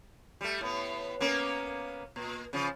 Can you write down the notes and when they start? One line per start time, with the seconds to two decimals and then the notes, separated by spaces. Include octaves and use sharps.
0.41 G3 A3
0.61 A2 B3
1.20 A#3 B3 C#4
2.16 A#2
2.53 C#3 F3